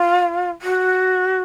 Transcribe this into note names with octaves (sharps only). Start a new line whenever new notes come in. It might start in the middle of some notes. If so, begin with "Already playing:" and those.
Already playing: F4
F#4